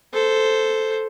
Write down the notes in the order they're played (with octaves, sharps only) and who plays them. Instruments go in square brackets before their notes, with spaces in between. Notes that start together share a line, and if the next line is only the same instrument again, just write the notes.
[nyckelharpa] A4 C5